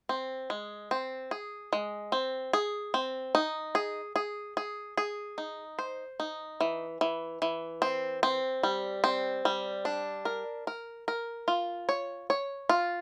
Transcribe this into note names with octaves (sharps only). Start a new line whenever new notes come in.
C4
G#3
C4
G#4
G#3
C4
G#4
C4
D#4
G#4
G#4
G#4
G#4
D#4
C5
D#4
E3
E3
E3
C4
C4
G3
C4
G3
D4
A#4
A#4
A#4
F4
C#5
C#5
F4